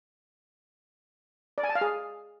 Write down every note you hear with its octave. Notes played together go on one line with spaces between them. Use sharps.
D5
G#5
A5
F5
G#4